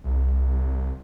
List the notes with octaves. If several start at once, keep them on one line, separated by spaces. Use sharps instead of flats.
C2